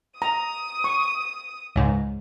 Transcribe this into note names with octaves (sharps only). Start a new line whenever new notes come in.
A#5 D#6
C#6
C#2 G#2